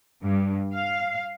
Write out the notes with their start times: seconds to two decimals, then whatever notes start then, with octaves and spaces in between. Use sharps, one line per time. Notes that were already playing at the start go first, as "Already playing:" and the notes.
0.23 G2
0.74 F5